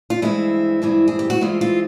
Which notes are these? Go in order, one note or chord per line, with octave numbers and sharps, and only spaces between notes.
F4
G2 E3 G#3 C4 E4
G2 E3 G#3 C4
G#4
G4
F#4
G2 E3 G#3 C4 F4
F4